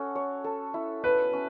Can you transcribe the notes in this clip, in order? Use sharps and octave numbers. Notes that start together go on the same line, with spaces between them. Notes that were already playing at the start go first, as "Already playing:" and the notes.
Already playing: C#4 F#4 A4
C#5
A4
E4
B4 E5
C#4